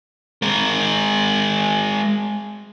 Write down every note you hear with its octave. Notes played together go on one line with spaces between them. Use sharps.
G#3 A#4